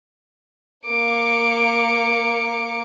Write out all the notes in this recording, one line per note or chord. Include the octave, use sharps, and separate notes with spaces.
A#3 D6 C#7